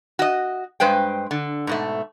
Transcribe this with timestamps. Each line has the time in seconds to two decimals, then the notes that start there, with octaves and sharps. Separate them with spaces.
0.19 F#4 D#5
0.80 G2 G#3 B4 C5 G5
1.31 D3
1.67 G#2 B2 A3